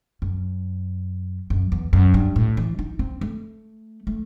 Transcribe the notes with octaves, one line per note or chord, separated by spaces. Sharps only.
F#2
F#2
E2
F#2
G2
A2
E3
D#4
C4
A3
A3